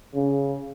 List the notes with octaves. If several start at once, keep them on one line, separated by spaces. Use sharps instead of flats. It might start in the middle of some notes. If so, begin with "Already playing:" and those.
C#3